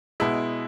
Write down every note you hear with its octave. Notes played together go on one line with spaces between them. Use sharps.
B2 G#3 E4